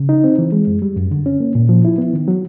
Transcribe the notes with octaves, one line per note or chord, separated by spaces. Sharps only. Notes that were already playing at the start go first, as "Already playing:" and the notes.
Already playing: C#3
D#4
C4
E3
G#3
F#2
G3
F#2
D3
C#4
A#3
A#2
F3
E4
B3
D#3
F#3